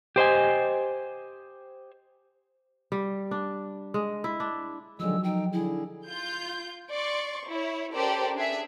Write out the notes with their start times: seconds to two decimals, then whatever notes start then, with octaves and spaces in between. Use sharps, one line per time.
0.16 G4 C5 D#5 G#5
2.92 G3
3.31 D4
3.94 G#3
4.24 E4
4.40 D4
5.00 D3 D#3 F3 F#3 G#3 E6
5.24 D#4 G5
5.53 D3 E4 G#4
6.07 F4 G6
6.91 D5 C6 C#6
7.48 E4 C#5
7.93 C#4 G4 A4 A#4 C5 D5
8.35 D4 G#4 E5